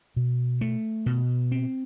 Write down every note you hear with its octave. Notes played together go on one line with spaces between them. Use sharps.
B2
A3
B2
C4